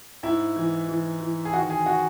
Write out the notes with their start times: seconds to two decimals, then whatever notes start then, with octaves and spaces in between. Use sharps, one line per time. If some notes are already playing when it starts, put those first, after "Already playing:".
0.23 G#2 E4
0.56 E3
0.89 E3
1.20 E3
1.45 G#4
1.53 D#3 F#4
1.70 G#4
1.86 F#4